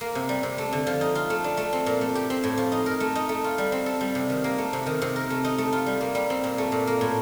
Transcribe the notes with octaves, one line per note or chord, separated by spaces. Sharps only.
A#3
C3
G3
C3
A3
D3
F3
D#4
F4
A3
D4
A3
C4
A#2
A3
G4
C4
A2
F3
D#4
A#4
A3
D#4
A3
F4
G3
C4
A4
G3
C3
D#3
A#3
A3
C3
D#3
C3
A#4
A3
D#4
A3
F4
G3
A#3
G3
C4
A#2
A3
A#2
A#3
A2